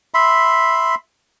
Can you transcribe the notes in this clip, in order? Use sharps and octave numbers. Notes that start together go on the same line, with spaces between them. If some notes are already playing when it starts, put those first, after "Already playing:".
E5 B5 C6